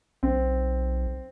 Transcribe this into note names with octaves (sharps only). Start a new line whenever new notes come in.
B1 C4